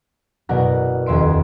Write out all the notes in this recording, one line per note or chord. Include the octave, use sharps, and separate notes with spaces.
F#1 B2 F#3 A#4 D5 F#5
D#1 F2 E5 C6 D7